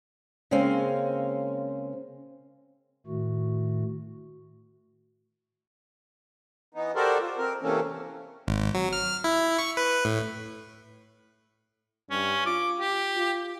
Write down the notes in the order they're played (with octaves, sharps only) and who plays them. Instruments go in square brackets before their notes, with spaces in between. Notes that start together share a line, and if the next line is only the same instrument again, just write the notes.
[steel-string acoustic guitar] C#3 G#3 A#3 C4 C#4
[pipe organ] A2 D#3 A3 F#4
[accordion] E3 B3 D#4
F#4 G4 A4 A#4 C5 D5
F4
C4 A#4
C3 E3 A3 A#3 C4 C#4
[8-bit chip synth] G#1
F#3
F6
E4
C#6
B4
A2
[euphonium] G2 [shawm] C#4
[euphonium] F4 [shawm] D6
[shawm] G4
[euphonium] F4